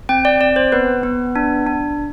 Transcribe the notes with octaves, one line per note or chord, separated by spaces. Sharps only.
C4 G5
D5
C4 D5
C5
B3 B4
B3
D4
D4